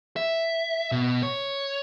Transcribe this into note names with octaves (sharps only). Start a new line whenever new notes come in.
E5
B2
C#5